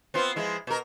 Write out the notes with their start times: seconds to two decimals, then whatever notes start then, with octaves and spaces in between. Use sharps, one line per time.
0.14 B3 C4 F4
0.36 F3 G#3 E4
0.67 B2 A#4